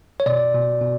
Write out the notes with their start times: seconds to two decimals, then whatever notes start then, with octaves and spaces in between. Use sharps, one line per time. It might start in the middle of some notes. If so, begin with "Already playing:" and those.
0.20 C#5
0.26 B2 D5
0.54 B2
0.81 B2